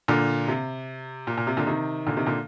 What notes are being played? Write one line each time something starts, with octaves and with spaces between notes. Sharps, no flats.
A#2 D3
C3
A#2
A#2
C3
A#2 D3
C3 D#3
A#2 D3
C3 D#3
A#2 D3